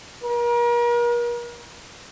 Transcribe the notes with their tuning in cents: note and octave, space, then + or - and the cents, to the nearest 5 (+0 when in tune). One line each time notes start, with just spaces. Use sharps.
A#4 +40